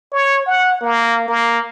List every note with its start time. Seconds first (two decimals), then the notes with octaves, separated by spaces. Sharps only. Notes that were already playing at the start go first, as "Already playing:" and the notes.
0.12 C#5
0.46 F#5
0.81 A#3
1.28 A#3